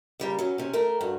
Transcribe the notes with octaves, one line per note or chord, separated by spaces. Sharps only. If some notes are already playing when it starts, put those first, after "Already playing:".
C#3 G3 A#3
F#3 C#4
C3 C#4
A3 A#4
G2 F#4